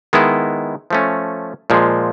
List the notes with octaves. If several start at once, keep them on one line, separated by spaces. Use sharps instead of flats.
D#3 G#3 B3 E4
F3 A3 C#4
A#2 F3 G#3